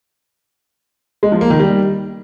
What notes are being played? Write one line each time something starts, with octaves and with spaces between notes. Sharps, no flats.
G#3
F3
A#3
D#3
G3